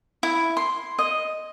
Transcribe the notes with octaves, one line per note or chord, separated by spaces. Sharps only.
E4
C6
D#5